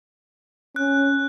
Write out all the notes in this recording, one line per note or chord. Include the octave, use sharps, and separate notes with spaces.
C#4 F#6